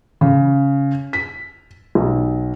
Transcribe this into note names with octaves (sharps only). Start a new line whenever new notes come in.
C#3
B6
B1